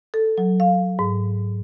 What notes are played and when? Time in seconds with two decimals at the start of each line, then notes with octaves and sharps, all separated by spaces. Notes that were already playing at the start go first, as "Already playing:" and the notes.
0.14 A4
0.38 F#3
0.60 F5
0.99 G#2